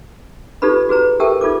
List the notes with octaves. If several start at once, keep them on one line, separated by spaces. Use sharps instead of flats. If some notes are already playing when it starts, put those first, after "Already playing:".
D#4 F4 G4 A4 B4 B5
F#4 G#4 B4 A#5
G4 A4 A#4 E5 G5 A5
D#4 F4 A4 D6